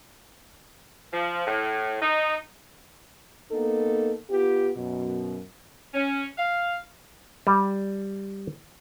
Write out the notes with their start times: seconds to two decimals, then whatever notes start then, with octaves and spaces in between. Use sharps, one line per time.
1.13 F3
1.46 A2
2.02 D#4
3.52 A#3 B3 D#4 A4
4.30 B3 F4 G4
4.76 F#2 B2
5.94 C#4
6.38 F5
7.47 G3